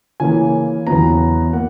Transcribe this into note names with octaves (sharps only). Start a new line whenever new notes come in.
C#3 E3 A#3 G#5
E2 C#3 F#3 B3 A#5
A#3 F#5